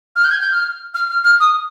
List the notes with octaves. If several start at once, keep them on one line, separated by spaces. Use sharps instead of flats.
F6
G6
G#6
G6
F6
F6
F6
F6
D#6